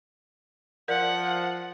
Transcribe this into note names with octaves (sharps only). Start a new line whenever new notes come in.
F3 A#4 D5 F#5